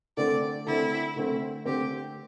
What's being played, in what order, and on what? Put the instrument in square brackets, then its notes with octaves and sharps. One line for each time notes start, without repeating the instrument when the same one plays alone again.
[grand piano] D3 A3 C4 [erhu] D5
[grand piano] D3 A3 C4 [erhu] E4
[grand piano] D3 A3 C4
[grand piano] D3 A3 C4 [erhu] G4